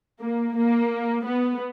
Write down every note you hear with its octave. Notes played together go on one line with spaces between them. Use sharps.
A#3
A#3
B3